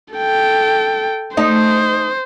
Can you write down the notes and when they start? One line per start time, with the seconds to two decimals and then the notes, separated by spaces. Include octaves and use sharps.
0.14 A4 G5
1.37 A3 D#4 C5 D#5